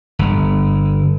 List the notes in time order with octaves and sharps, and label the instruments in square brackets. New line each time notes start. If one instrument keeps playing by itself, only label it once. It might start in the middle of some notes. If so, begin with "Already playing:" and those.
[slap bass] G1